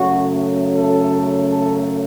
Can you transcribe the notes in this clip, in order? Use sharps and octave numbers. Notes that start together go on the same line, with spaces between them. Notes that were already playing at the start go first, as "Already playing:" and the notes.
Already playing: F#2 C#3 F#3 A3 F#4
A4
A4